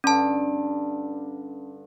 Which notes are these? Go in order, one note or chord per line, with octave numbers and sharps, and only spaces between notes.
G2 D3 C#4 A5